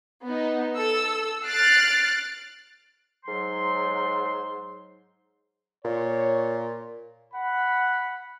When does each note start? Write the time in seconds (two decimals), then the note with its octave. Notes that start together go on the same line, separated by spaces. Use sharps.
0.24 B3 D#4
0.75 A4 E6
1.46 F6 F#6 A6 C7 D7
3.24 G#2 F#3 C6
5.85 A#2 C#5
7.32 F#5 B5